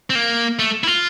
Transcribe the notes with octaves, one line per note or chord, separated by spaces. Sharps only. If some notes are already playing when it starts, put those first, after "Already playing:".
C4
A#3
A3
E4
F4